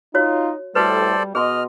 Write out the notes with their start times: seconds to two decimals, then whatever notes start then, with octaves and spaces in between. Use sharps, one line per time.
0.15 D#4 F4 F#4 C#5
0.75 A2 G3 F#4 A4 B4 C5 D5
1.35 B2 G#4 D#5 C6 F6